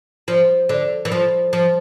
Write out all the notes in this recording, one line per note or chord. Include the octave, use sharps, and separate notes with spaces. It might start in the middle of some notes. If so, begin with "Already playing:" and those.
F3
D3
E3
F3
F3